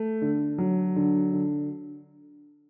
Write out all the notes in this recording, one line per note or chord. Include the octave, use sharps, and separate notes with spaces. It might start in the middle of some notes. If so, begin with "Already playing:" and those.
Already playing: A3
D3
F#3
D3
D3